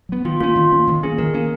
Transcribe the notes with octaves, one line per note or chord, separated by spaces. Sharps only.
F#3 B3
D#3 F4
A#3 C#4 F4
D#3
A#3 C#4
D#3
A#3 C#4 G#4
D#3 A#4
A#3 C#4